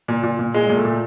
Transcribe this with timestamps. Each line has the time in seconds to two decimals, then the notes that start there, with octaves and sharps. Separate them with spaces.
0.08 A#2
0.23 A#2
0.39 A#2
0.54 A#2 G#3
0.69 A#2
0.77 A3
0.85 A#2